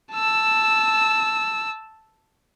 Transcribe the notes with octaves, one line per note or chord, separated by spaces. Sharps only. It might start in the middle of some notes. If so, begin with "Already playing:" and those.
A5 E6